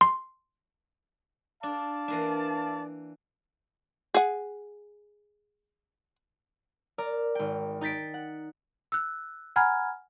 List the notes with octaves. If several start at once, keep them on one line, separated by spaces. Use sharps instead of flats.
C6
D4 D5 F5 A5
E3 A#3 D4
G#4 F#5
A#4 D5 A#5
G#1 G5
D#4 G6 A6 B6 D7
F#5
E6 F#6
F#5 G#5 A#5 B5 F6 G#6